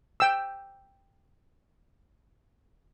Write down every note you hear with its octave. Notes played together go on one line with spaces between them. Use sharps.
G5 E6